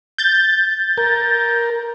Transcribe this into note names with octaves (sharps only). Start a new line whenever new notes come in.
G6 A6
A#4